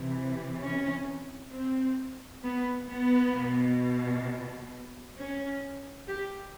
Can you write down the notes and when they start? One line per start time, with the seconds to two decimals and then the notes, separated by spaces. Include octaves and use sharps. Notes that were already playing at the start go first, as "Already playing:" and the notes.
Already playing: C3 E3
0.61 C#4
1.53 C4
2.44 B3
2.90 B3
3.35 B2
5.18 C#4
6.09 G4